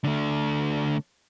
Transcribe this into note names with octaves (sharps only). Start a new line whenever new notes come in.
D3 A3